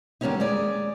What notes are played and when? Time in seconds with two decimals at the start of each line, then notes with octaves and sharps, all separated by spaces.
0.21 D#2 G3 A#3 B3 C#4 D#4
0.40 G#3 G#4 D5